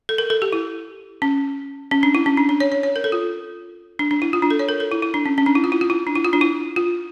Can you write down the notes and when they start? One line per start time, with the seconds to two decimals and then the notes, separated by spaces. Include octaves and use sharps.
0.09 A4
0.18 A#4
0.30 A4
0.42 G4
0.53 E4
1.22 C#4
1.91 C#4
2.03 D4
2.15 E4
2.26 C#4
2.37 D4
2.49 D4
2.60 C#5
2.72 C#5
2.83 C#5
2.96 A#4
3.04 A4
3.12 F4
3.99 D4
4.11 D4
4.22 E4
4.33 F4
4.42 D4
4.50 A4
4.59 C#5
4.69 A#4
4.80 A4
4.91 E4
5.02 E4
5.14 D4
5.26 C#4
5.38 C#4
5.46 D4
5.55 E4
5.64 F4
5.72 E4
5.81 F4
5.90 E4
6.07 D4
6.15 E4
6.25 F4
6.33 D4
6.41 E4
6.76 F4